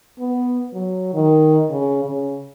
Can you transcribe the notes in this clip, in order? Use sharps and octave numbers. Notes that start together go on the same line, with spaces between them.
B3
F#3
D#3
C#3
C#3